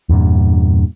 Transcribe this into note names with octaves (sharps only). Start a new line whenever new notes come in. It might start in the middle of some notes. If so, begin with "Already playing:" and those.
E2 G2 A#2